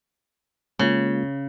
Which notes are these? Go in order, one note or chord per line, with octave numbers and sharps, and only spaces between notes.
C#3 G#3 A#3 F4